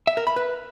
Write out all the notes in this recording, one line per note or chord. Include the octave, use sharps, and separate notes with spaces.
E5
A#4
B5
B4